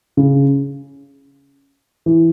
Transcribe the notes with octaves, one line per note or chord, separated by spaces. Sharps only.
C#3
E3